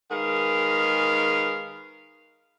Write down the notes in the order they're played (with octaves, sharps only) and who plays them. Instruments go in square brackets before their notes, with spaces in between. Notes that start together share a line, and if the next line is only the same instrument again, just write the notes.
[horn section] D#3 G#3 G#4 A#4 B4 F5